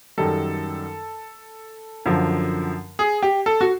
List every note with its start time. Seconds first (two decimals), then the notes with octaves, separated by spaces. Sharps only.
0.17 F#2 D#3 G3 A4
2.05 F#2 D3 F3
2.99 G#4
3.23 G4
3.46 A4
3.61 F#4